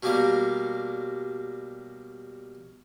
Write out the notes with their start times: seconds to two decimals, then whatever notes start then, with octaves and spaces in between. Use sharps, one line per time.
0.03 B2 F#3 G3 A#3 F5